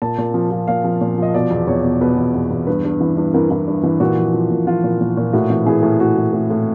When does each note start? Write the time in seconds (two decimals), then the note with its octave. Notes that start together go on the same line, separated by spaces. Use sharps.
0.02 A#2 A5
0.18 A#2
0.34 F3
0.51 F3
0.68 A#2 F5
0.84 F3
1.01 A#2
1.18 F3 D#5
1.34 B2 D5
1.51 E2
1.67 E2 C#5
1.84 B2
2.01 B2 B4
2.17 E2
2.34 E2
2.51 E2
2.67 G2 B4
2.84 G2
3.01 E3
3.17 G2
3.34 E3 A#4
3.51 E3
3.68 G2
3.83 E3
4.00 A#2 F#4
4.18 F3
4.33 F3
4.51 A#2
4.67 F3 F4
4.84 A#2
5.01 A#2
5.17 A#2
5.33 A2 F#4
5.50 E3
5.66 E3 G#4
5.83 A2
6.00 A2 F#4
6.17 E3
6.33 A2
6.50 A2